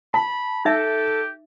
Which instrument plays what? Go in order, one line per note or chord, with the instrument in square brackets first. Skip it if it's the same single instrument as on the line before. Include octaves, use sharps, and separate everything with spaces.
[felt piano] A5 [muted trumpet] B5
[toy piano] D#4 E5 [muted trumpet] G4 [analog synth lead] A4